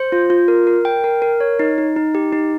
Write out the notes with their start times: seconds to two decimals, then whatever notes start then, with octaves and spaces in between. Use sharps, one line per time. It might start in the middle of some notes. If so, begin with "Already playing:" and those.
Already playing: C5
0.12 F4
0.30 F4
0.48 A#4
0.67 A#4
0.85 G5
1.04 A#4
1.22 A#4
1.40 C#5
1.59 D#4
1.78 D#4
1.96 D#4
2.15 G4
2.33 D#4